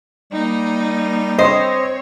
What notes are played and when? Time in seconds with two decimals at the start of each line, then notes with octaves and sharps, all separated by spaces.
0.32 G3 A#3 D#4
1.39 C4 C5 C#5 D#5